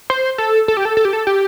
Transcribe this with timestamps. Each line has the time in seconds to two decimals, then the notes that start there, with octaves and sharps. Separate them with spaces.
0.10 C5
0.38 A4
0.68 A4
0.77 G4
0.85 A4
0.97 A4
1.05 G4
1.13 A4
1.27 G4